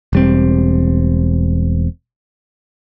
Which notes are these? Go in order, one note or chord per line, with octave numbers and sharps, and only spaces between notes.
E1 G3 C4